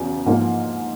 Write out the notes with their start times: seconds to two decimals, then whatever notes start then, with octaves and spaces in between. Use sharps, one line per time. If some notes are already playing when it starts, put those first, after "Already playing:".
Already playing: E2 C#3 F#3
0.26 G#2 F3 A#3